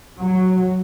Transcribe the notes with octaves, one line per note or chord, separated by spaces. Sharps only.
F#3